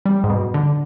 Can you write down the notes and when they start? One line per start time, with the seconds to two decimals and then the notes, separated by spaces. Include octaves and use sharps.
0.06 G3
0.24 G#2
0.30 B2
0.54 D3